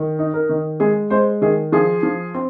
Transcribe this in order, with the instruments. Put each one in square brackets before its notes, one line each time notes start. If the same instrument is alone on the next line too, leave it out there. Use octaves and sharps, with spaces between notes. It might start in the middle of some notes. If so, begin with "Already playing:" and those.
Already playing: [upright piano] D#3
D#4
A#4
D#3
G#3 G#4
G#3 C5
D#3 G#4
F3 G#4
F3
C4